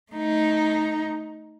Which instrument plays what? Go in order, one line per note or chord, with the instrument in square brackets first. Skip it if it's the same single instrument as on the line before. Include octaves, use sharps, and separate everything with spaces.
[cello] A3 D#4